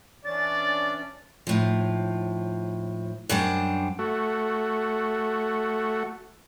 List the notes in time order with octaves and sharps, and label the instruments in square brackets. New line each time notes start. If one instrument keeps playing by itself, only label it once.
[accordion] E3 C#4 D4 [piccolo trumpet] D5 [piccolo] A6
[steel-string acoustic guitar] D#2 A2 F3
F#2 G3 D4 C5
[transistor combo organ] A3 F#4